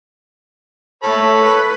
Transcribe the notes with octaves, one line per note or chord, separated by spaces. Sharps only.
A3 A4 C#5 B5
B4